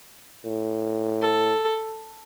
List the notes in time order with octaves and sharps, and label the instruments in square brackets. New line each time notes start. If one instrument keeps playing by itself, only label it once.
[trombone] A2
[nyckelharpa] A4